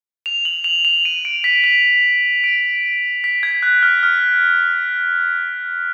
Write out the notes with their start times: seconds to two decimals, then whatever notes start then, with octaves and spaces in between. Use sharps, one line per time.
0.26 F7
0.45 F#7
0.64 F7
0.85 F7
1.05 D#7
1.25 D7
1.44 B6
1.64 F7
2.44 D7
3.24 B6
3.43 G#6
3.63 F#6
3.83 F6
4.03 F6